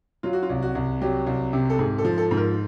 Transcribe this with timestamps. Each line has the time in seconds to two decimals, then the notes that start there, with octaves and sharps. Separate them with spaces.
0.23 F#3 F4
0.33 F#4
0.43 F4
0.50 C2
0.62 F#4
0.75 C2
1.01 F#3 G4
1.27 C2
1.53 C3
1.70 A4
1.79 G#2 G#4
1.98 A4
2.05 F3
2.18 A4
2.31 G#2
2.37 A#4